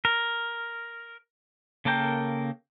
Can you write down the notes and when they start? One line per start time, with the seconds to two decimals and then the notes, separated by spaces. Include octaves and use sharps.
0.05 A#4
1.85 C#3 A#3 A4 A#4 G5